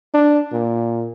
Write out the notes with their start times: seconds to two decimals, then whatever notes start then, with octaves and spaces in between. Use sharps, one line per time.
0.14 D4
0.52 A#2